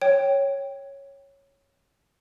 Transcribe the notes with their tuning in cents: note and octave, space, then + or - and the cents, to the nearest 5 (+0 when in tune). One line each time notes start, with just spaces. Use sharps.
C#5 -5 G5 +0